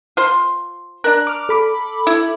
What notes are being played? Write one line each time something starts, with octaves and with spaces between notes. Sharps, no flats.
F4 C5 C6
D4 A#4 F#6
D6 F6
A4 B5 D6
E4